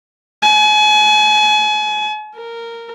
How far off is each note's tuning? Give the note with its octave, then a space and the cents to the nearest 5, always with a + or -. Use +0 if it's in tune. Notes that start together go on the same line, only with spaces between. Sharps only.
G#5 +35
A#4 -10